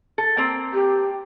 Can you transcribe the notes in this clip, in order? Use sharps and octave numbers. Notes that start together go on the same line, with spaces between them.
A4
A#3 C4
G4